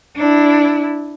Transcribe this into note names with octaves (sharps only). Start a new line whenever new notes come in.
D4 E4